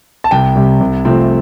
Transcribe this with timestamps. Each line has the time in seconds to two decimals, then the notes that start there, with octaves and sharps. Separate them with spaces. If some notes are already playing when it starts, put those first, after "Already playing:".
0.24 A5
0.31 C2 G5
0.56 C3 G3
0.81 C2
1.05 C3 F3 A3 C4